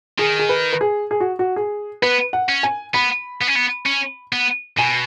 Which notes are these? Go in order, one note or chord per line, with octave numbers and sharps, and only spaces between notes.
D#3 G#4
G#4
B4
B4
G#4
G#4
F#4
F#4
G#4
B3 B4
F#5
C#4
G#5
B3 B5
B3
C#4
B3
C#4
B3
B2 G#5